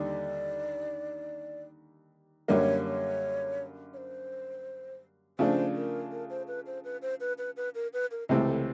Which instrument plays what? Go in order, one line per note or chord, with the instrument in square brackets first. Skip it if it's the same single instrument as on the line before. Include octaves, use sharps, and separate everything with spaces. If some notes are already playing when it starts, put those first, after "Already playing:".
Already playing: [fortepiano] D#2 D3 G3 [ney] D5
[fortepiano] F#2 D3 G3 A#3 [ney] C#5 D5
[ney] C#5
C#5
C5
[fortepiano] C#3 F3 A3 D4 [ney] C5
[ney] A#4
A#4
C5
B4
C5
B4
C5
B4
B4
B4
A#4
B4
A#4
[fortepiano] C#2 C3 E3 A3 C4 [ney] G#4
[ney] A4